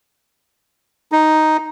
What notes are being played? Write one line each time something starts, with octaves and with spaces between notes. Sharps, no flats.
D#4